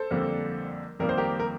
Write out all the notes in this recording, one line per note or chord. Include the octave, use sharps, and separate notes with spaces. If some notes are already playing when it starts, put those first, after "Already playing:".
Already playing: A4 C5
F2 D3 G3 A#3
F2 D#3 G3 A#3 A#4
C5
G4 A#4
A#4